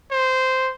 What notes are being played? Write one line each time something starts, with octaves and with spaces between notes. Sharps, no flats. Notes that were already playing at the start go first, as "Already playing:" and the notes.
C5